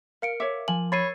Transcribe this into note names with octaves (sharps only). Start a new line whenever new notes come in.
A#4 F5 C#7 D7
C#5 E5 D6
F3 G#5 F#7
C#5 B5 E6 A6 C7 D#7